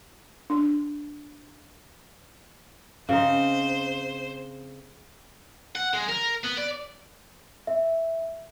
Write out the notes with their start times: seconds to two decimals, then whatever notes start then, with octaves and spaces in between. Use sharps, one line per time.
0.50 D4
3.09 C#3 C4 D#4 C5
5.75 F#5
5.94 G#3
6.09 A#4
6.44 B3
6.58 D5
7.67 E5